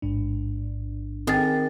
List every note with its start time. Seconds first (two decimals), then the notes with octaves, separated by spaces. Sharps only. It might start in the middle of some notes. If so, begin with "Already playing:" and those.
0.02 A1 G#2 D4
1.27 D#3 C4 G#4 A6